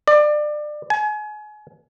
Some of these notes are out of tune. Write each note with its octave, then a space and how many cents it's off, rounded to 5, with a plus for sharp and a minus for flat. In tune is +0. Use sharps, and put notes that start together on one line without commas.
D5 +25
G#5 +30